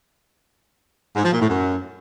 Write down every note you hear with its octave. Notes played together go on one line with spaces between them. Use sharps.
G#2
F3
A#2
A2
F#2